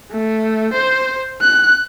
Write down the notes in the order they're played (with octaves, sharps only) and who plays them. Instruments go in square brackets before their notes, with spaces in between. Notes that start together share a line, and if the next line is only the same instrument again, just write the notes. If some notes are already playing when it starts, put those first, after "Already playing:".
[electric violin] A3
C5
F#6